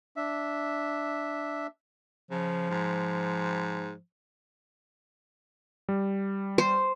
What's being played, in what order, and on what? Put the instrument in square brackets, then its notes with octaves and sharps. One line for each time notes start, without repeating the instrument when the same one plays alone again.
[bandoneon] D4 E5
[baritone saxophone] C#3 [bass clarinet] F3
[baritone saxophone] G#2
[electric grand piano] G3
[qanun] C5